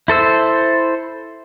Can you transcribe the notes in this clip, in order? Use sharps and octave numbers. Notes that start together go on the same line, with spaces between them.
E4 A4 C5 E6